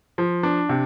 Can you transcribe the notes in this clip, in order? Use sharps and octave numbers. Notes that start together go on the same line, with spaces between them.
F3
D4
C3